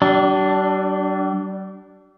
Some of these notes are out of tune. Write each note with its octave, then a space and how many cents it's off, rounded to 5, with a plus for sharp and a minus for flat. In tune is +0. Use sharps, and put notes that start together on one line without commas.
G3 -45 D4 +0